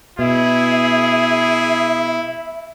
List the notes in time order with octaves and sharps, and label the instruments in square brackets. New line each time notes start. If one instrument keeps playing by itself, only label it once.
[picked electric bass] B2 [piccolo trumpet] E4 [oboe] G#4 [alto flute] E5